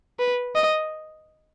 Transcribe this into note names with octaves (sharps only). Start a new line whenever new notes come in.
B4
D#5